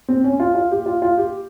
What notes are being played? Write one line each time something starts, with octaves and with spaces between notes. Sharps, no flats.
C4
C#4
F4
F4
G4
F4
F4
G4